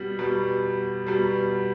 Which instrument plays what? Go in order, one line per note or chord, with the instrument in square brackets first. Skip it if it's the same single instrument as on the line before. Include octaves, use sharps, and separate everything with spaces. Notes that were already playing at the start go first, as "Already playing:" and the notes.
Already playing: [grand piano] B2 G3
B2 G3
B2 G3